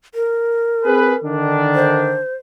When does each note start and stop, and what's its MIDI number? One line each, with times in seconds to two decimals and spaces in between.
0.15 1.29 70
0.85 1.15 60
0.85 1.15 68
0.85 1.15 71
1.23 2.19 50
1.23 2.19 51
1.23 2.19 62
1.75 2.35 72